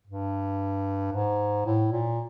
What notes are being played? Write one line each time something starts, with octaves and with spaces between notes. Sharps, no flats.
G2
G#2
A2
A#2